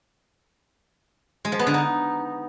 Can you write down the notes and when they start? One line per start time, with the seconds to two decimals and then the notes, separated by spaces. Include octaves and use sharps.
1.45 G#3
1.52 F3
1.59 B3
1.67 D3
1.74 D#4